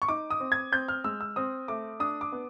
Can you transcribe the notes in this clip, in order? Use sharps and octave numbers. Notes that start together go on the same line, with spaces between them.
C#6
D#4 D6
D#6
C4
G#6
C4 G6
F6
G#3 E6
E6
C4 D#6
A3 D6
D4 D#6
D6
B3